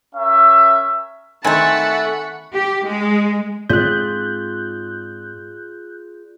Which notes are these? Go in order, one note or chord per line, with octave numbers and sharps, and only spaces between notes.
C#4 A#4 E5
D#3 A3 C4 F#5 G#5 A5 B5 C#6
G4
G#3
G#2 C4 F4 G#4 D5 F#6 G6